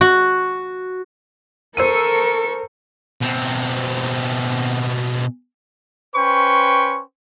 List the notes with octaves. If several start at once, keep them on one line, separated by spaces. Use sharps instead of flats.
F#4
A4 A#4 C5 C#6 E6 D#7
B2 C4
C#4 B4 C5 G5 C#6